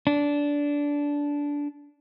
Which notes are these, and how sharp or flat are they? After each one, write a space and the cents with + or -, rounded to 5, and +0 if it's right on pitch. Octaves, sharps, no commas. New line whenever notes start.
D4 -15